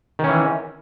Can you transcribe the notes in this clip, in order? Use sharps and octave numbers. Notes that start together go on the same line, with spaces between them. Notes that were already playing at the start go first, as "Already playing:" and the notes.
D#3 E3 C#4